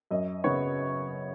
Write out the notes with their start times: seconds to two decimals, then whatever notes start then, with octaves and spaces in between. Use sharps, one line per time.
0.11 F#2 D#5
0.44 C#3 B3 C#5